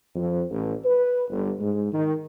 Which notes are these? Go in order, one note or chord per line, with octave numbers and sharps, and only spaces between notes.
F2
A1
B4
G1
G#2
D#3